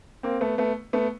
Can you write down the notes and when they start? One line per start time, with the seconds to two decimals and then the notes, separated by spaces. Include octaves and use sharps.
0.23 A#3 C4
0.41 A3 B3
0.58 A3 B3
0.93 A3 B3